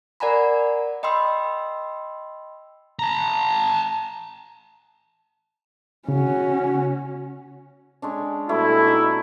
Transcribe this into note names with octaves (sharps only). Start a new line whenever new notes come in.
A#4 D5 F#5 G#5 A#5 B5
D#5 G5 B5 C6 E6
A5 A#5
C#3 C#4 F#4
G#3 C#4 D4
B2 G3 A3 E4
D#4